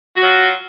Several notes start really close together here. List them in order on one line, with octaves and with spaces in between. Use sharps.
F#4 F#3 F4